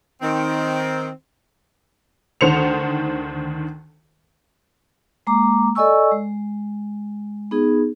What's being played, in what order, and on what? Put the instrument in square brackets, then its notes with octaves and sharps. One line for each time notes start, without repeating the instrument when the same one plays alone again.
[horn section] D#3 C4
[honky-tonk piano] D2 D#3 C5 C#7 F7
[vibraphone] G#3 A#3 A#5 D6
A4 D5 D#5 G#5 C#6 E6
G#3
B3 D#4 G#4